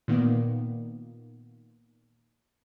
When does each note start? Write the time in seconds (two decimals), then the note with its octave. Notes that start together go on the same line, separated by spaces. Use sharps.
0.08 A#2 D#3 A#3 B3